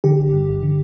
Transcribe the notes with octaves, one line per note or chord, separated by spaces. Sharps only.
D3 G4
G1
G2
G1
D3